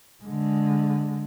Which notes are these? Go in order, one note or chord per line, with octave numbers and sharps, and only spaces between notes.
D3 G#3